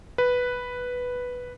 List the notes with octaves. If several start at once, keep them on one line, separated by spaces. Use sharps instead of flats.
B4